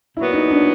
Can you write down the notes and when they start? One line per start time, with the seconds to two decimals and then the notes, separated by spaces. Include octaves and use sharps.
0.16 A#2 E4
0.19 F#3 B3
0.33 D#4
0.51 D4